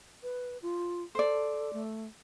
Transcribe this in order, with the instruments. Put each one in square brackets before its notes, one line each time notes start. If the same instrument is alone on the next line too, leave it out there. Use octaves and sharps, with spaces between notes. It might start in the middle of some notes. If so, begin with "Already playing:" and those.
[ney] B4
F4
[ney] A4 [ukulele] C5 D5
[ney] A3